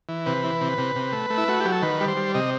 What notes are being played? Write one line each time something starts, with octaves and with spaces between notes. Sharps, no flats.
E3
C3 B4
E3
C3
C3
C3
A3
A3
E4
A3 F#4
F#3 G4
A4
D#3 B4
G3
C5
G3
C3 D#5